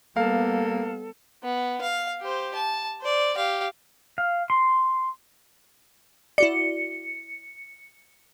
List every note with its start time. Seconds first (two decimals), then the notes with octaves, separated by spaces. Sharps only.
0.17 G3 A#3 B3 A4 F5
1.43 B3
1.81 F5
2.21 G4 C5
2.55 A5
3.01 C5 D5
3.36 G4 F5
4.18 F5
4.50 C6
6.38 E4 F#4 D5 C#7